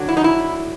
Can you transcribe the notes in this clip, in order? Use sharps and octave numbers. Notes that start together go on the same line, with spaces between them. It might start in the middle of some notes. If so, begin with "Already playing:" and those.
Already playing: D3 F#3
E4
D#4
E4